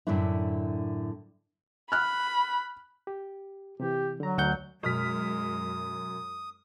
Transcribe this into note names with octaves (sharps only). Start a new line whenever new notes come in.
F#2 A2 D3 A3 D4 E4
B5 F6 F#6
G4
C3 E3 G4
D3 F#3 A#5
D2 F#5 G6
F#2 B2 G#3 D#6 F6 B6